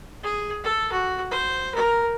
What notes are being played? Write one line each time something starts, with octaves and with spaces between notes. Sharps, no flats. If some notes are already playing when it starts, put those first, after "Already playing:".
G#4
A4
F#4
C5
A#4